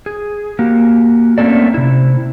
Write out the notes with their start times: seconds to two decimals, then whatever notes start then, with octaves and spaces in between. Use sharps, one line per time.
0.06 G#4
0.59 A#3 F#4 G4
1.38 A3 A#3 C4 C#4 A4 D5
1.74 C3 E4